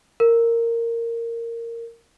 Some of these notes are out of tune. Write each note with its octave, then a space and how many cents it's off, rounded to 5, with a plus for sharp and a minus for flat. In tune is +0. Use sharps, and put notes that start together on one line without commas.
A#4 -10